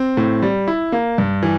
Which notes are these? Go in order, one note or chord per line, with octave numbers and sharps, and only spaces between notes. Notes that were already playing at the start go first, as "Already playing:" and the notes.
Already playing: C4
A2
G3
E4
A#3
G2
E3